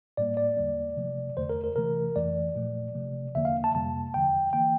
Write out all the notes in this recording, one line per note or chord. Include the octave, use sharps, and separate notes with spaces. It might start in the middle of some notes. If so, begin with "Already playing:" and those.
A2 G3 A#3 D5
D5
E2 D3 G3 A#3
C3 F3 A3
E2 D3 A3 C5
A#4
A#4
C3 E3 A3 A#4
F2 E3 A3 D5
A#2 F3 A3
C3 F3 A3
E2 D3 F3 A#3 E5
F5
A5
F2 C3 G3 A#3 A5
E2 D3 F3 G5
E3 A#3 G5